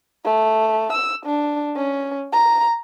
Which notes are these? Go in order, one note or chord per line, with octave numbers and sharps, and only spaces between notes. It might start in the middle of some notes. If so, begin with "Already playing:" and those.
A3
E6
D4
C#4
A#5